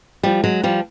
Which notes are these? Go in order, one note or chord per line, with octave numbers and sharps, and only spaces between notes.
F3 G3
F#3 G#3
F3 G3